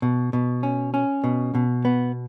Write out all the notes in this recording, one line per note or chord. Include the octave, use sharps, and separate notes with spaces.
B2
B2
C#4
C#4
B2
B2
B3